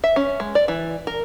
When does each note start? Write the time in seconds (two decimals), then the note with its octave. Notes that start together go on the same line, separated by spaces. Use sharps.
0.04 E5
0.16 C#4
0.40 G#3
0.55 D5
0.68 E3
1.07 A#4